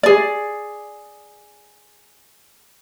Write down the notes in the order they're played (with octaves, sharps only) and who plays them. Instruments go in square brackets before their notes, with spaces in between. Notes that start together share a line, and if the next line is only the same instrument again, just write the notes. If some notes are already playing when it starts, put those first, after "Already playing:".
[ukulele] G#4 D5